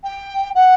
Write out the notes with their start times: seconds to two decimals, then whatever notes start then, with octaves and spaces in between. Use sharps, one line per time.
0.04 G5
0.55 F#5